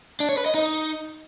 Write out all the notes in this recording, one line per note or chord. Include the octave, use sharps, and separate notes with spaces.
D4
C#5
B4
D#5
D#4